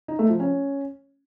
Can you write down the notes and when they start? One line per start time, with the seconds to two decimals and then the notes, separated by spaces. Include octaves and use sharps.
0.08 D#4
0.19 A3
0.29 F3
0.40 C#4